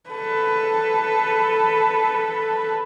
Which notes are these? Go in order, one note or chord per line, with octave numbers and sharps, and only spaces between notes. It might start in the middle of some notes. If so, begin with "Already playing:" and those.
A4 B4